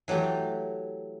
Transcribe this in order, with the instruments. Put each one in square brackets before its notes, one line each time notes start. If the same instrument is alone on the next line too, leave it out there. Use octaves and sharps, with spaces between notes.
[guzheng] E3 F#3 A3 G4